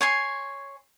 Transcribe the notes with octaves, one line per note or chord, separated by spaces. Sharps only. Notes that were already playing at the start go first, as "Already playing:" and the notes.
C#5 G#5 C6